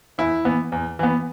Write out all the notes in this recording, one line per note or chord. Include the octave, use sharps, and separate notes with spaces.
E2 E4
E3 B3
E2
E3 B3